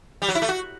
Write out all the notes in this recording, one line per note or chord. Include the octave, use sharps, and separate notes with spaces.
G3
F#3
E4
A3
F#4